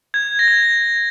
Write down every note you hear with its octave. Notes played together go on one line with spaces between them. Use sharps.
G#6
A#6
G#6